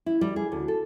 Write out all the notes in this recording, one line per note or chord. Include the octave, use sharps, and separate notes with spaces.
E4
G3
G#4
D2
A4